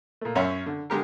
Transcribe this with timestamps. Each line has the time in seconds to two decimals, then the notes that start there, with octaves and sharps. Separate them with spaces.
0.21 A#2 A3
0.35 F#2 C#4 C#5 E5 F#5 C6
0.66 D3
0.90 D3 G#3 G4 A#4